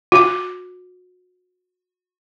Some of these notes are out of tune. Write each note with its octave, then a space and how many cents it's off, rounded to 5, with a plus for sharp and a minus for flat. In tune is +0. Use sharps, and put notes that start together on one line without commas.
F#4 -30